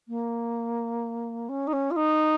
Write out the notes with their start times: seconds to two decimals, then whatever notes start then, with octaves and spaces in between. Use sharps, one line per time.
0.08 A#3
1.49 C#4
1.67 D#4
1.73 C#4
1.91 F4
1.96 D#4